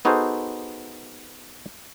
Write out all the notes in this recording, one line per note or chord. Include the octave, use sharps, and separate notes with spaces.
B3 D#4 F#4 G#4 A4 C5